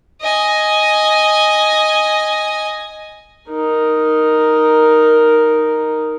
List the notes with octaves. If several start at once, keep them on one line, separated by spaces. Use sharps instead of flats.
D#5 G#5
D#4 A#4